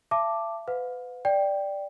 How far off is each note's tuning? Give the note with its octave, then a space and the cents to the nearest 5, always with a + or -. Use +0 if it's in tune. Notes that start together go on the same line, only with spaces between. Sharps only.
E5 +40 A5 +5 D6 +0
B4 +30 F5 +45
D5 +0 G5 +0